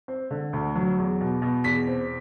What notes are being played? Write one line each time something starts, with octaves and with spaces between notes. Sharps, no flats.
C4
D3
D2
F#3
E2
B2
B2
E2 B6
C4